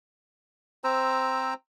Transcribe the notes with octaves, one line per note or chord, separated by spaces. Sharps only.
C4 C5 A#5 E6